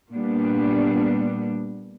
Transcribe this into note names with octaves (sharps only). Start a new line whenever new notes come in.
A#2 G3 B3 D4